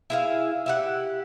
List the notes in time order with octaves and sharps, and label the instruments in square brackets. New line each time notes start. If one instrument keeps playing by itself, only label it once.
[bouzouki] E4 G#4 F5
E4 G4 F#5